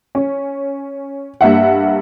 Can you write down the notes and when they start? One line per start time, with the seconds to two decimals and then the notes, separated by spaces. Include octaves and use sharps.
0.15 C#4
1.41 G2 A#3 E5 F#5